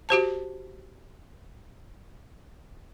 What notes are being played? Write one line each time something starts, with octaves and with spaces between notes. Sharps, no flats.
F#4 G4 C5 A5